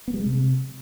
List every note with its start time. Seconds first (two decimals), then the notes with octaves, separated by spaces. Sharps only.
0.08 B3
0.14 G3
0.20 G#3
0.26 C3